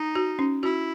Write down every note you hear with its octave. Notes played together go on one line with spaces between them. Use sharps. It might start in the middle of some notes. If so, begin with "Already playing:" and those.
Already playing: D#4
F#4
C#4
E4 F#4